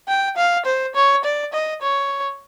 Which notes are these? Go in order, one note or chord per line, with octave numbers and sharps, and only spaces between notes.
G5
F5
C5
C#5
D5
D#5
C#5